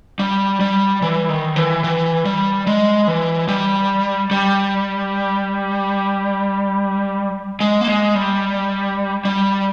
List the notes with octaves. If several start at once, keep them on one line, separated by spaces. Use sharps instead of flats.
G3
G3
E3
D#3
E3
E3
G3
G#3
E3
G3
G3
G#3
A#3
G#3
G3
G3